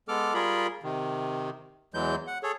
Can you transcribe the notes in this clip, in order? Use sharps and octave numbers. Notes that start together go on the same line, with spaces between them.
G#3 B3 A4 D6 F6
G3 F4 G#4 A#4 B5
C3 D#3
E2 E3 F#3 G#3 G6
F#5
G#4 A4 C#5